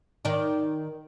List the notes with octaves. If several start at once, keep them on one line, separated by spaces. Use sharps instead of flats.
D#3 D5